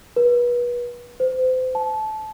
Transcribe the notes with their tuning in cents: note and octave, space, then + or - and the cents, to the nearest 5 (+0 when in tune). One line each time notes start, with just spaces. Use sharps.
B4 -30
C5 -35
A5 -20